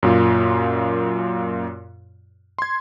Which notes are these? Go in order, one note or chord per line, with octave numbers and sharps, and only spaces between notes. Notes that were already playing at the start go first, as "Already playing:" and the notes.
F#2 A#2 F4
C6 G#6